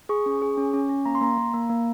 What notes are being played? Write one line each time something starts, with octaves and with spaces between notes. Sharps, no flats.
G#4 C#6
C#4
G#4
C#4
C#4
C#4
A#3 A#5
C6
A#3 A#5
A#3
A#3
A#3